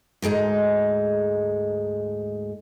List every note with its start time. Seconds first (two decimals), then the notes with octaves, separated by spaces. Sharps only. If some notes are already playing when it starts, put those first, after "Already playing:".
0.22 D2 G#2 G#3 D#4